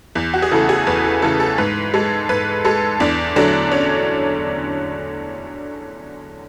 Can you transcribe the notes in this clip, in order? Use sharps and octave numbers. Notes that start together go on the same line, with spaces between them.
E2
F#4
G#4
C#3 E3 A3 A4
G#4
E2 B4
A4
C#3 E3 A3 A4
A4
G#2 B4
G#3 A4
G#2 B4
G#3 A4
E2 D4
D3 F#3 A3 D4
C#4